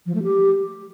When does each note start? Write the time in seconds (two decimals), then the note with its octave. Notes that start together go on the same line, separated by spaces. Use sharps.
0.06 F3
0.15 A3
0.24 G4